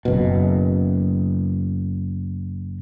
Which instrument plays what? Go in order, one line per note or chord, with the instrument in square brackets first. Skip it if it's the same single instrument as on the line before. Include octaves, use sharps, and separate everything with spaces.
[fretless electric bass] F#1 B2